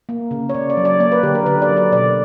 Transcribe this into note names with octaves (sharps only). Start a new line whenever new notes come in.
A#3
C#3
C#5
C#3 D5
D5
F#3
D5
A#3 D5
B4
D3 G4
A#4
D3 B4
D5
F#3
D5
B2 D5